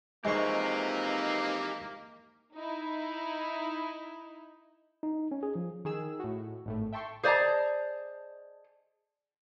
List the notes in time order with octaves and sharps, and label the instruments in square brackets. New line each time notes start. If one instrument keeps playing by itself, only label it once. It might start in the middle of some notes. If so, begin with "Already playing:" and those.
[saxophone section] E3 F3 D#4 [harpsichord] G#3 C#6 [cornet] A#3 [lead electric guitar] G4 C5
[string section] D#4 E4
[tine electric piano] D#4
C#4
G#4
F3
[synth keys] D#3 G#4 E6
A2 F#4
G#1 A2 A3
E5 G5 A5 C6 C#6
[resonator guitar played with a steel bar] G#4 C5 D5 D#5 A5 A#5